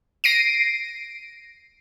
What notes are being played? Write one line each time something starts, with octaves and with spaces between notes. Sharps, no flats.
A#6 C7 D7 D#7